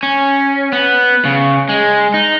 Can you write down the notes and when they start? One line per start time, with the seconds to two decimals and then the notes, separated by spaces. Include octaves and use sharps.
0.03 C#4
0.72 B3
1.25 C#3
1.69 G#3
2.14 D#4